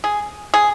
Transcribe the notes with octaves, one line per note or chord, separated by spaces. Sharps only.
G#4
G#4